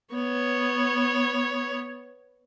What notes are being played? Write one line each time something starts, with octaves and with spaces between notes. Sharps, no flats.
B3 C#5